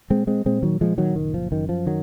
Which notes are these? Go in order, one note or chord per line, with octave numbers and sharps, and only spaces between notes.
A#2 G#3 C4
G#3 C4
A#2 G#3 C4
D#3 F#3
A#2 F3 G#3
D#3 F#3
F#1 D#3
F3
F#2 D#3
F3
D#3 F#3